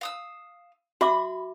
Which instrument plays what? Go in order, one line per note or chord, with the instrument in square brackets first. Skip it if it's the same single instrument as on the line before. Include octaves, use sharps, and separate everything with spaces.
[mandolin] F5 D#6 E6
[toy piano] F#4 E5 D6 [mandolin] B5